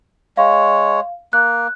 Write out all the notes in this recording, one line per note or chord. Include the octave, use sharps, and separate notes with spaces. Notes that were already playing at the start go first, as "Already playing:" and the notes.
G#3 C#5 F5
A#3 F#6